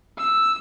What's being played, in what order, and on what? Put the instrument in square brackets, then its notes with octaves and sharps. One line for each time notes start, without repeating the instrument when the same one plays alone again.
[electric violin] E6